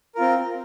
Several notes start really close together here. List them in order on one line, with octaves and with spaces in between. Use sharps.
A#4 F4 C4